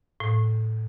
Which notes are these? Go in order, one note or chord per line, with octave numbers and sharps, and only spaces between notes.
A2